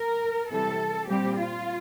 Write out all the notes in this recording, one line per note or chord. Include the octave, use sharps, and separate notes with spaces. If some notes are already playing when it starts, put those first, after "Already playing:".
Already playing: A#4
C3 E3 G3 A4
A#2 G3 C4 G4
F4